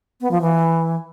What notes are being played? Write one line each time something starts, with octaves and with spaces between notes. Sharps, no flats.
B3
F3
E3